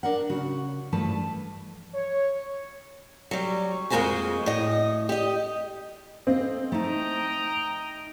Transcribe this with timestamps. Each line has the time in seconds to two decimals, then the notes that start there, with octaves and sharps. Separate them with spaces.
0.03 D4 A#4 F#5
0.29 C#3 F#4
0.92 G2 E3 F3 A3 B4 A5
1.94 C#5
3.31 F#3 G3
3.90 F2 G#3 A#3 F#4 C5 G#5
4.46 A2 D#5
5.09 G4 D#5
6.27 C4 A4 D#5 F5
6.72 A3 D#4 D#5 G5 A#5